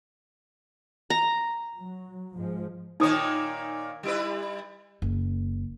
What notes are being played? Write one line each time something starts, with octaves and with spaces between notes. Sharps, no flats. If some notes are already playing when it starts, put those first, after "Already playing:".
A#5
F#3
G#2 F3 G#3
A#2 D#3 D#4 C#5 D#6
G3 E4 B4
F#1